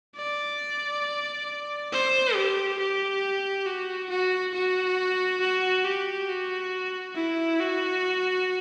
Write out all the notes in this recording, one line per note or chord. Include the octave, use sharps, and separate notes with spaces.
D5
C5
G4
G4
F#4
F#4
F#4
F#4
G4
F#4
E4
F#4